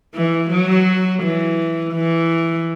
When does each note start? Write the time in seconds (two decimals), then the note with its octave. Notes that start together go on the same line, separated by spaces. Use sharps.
0.15 E3
0.50 F#3
1.22 E3
1.94 E3